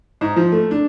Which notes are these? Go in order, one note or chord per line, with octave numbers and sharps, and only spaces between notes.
G#2
F3
A3
D4